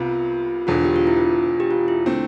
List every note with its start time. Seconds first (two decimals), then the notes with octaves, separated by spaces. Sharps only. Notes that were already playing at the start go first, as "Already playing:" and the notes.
Already playing: C2 C3 B3 F4
0.67 E1 E2 D3 F4
0.85 G4
0.96 F4
1.07 E4
1.17 F4
1.60 G4
1.71 F4
1.88 E4
2.06 D3 A3 C4